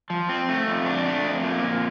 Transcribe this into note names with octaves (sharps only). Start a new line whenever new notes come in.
F3
C4
A3
F2
D4
A3
F2
A#3
F2